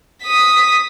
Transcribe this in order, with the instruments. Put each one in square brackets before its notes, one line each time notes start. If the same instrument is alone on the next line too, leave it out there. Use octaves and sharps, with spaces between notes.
[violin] D#6 B6